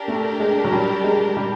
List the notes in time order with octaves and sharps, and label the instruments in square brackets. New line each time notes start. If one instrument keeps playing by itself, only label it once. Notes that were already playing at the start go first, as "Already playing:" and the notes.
Already playing: [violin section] D4 G4 A#4
[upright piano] A3
G#3
F#3
G3
G#3
G3